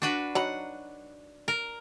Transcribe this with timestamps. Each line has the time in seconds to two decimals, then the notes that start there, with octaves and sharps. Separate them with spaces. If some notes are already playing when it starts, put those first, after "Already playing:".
0.02 D4 F#4 B4
0.35 F#3 D#4 F#5 B5
1.48 A#4